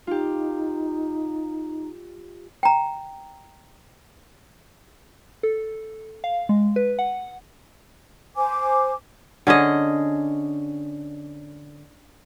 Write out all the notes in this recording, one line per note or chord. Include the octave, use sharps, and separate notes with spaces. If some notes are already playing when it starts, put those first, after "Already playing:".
D#4 F4 G4
G5 A#5
A4
F5
G#3
B4
F#5
C5 G#5 D6
D3 C#4 G#4 D#5